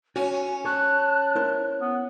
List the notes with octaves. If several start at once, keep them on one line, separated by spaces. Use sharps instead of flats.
C#4 F#4 G#5
G#5
C#5 A5 F#6
E4 A#4 C5
B3